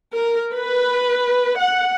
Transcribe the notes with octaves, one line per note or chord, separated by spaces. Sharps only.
A#4
B4
F#5